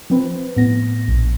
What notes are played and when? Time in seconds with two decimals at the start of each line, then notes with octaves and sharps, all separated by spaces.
0.10 F3 C4 B4
0.56 A2 B3 A#6
1.08 A#1